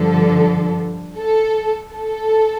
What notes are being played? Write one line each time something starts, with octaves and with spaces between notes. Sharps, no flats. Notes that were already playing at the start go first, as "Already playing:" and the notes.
Already playing: G2 D3 F3 A4
A4
A4